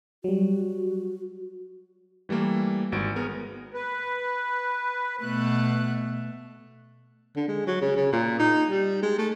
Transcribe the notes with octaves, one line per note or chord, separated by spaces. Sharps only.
F#3 G3 F#4
E3 G3 A3 A#3
G#1 F#4 D7
B3 G#4 A#4
B4
B2 A3 F#6
D3
G#3
F#3
C#3
C#3
A#2
D#4
G3
G#3
A3